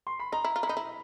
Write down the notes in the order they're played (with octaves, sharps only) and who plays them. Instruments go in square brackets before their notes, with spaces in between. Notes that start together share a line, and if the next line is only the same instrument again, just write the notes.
[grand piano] C6
B5
[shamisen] D#4 [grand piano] A#5
[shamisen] E4
F4
E4
[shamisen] D#4 [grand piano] B5
[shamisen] E4